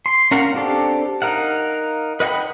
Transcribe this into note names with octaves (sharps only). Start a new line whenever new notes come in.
C6
C#4 A#4 F5 F#5
C4 D4 G4 A4
D#4 A#4 F5 F#5
B4 D#5 F#5 G5 B5